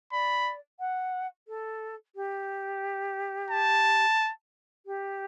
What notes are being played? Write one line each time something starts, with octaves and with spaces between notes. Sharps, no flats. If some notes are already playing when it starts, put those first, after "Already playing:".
D5 B5
F#5
A4
G4
A5
G4